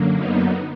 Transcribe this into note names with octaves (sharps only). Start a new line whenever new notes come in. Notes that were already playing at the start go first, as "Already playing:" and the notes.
Already playing: F#2 D3 F#3 A#3
B3 D#4